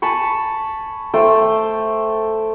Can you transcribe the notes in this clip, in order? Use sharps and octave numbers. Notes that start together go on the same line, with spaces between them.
G#5 A5 B5 C#6
A3 C5 G5 A5